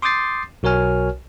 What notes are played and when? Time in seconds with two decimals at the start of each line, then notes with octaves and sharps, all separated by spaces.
0.02 C6 D6 D#6 G6 A6 C7
0.63 B1 F#4 A#4 C#5 G#5 F6